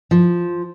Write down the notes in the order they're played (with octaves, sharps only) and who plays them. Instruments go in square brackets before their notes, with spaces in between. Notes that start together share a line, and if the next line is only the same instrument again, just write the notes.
[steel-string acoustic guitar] F3